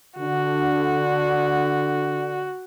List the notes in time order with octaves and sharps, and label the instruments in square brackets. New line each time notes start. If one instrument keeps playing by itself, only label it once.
[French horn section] D3 [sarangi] F#4